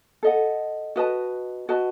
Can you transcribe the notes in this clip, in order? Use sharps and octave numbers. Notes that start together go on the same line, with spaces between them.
A4 D#5 F#5
F#4 B4 D#5 A5
F#4 B4 D#5 A5